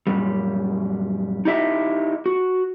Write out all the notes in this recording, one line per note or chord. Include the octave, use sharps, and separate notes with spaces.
F#2 A#2 G3
D#4 E4 G4 D#5 E5
F#4